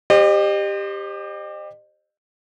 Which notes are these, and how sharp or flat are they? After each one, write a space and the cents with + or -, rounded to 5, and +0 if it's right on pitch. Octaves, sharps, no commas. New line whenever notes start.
G4 +15 C5 +15 D#5 -40